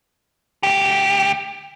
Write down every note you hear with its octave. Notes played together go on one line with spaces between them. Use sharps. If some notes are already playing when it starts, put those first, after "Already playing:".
D2 G4